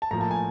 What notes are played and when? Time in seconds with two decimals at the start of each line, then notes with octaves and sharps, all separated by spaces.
0.02 A5
0.11 A2 F3 A#3 A#5
0.21 A5
0.31 G#5